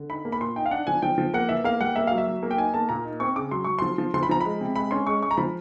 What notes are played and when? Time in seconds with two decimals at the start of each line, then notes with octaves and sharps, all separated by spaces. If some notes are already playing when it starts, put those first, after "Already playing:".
Already playing: D3
0.10 D#4 B5
0.25 A#3
0.32 B5
0.41 A#2 C6
0.56 D#4 G5
0.66 F5
0.71 D4 F#5
0.87 F3 G#5
1.02 F3 G5
1.18 F3
1.34 A#3 F#5
1.49 E3 E5
1.64 A#3 F5
1.80 G3 F#5
1.96 A#3 E5
2.07 F#3 F5
2.18 E5
2.27 F#3
2.43 A#3
2.51 G5
2.58 D#4 G#5
2.74 A#3 A5
2.89 A#2 A#5
3.05 D#4
3.20 C4 C#6
3.36 C#3 D6
3.51 F#3 C6
3.64 F#3 C#6
3.79 F3 C6
3.98 F3
4.14 F3 C6
4.23 B5
4.29 F3 A#5
4.40 G#3 B5
4.61 C3
4.76 G#3 B5
4.91 C#4 C6
5.07 G#3 C#6
5.22 G#3 C#6
5.31 A#5
5.37 F3 B5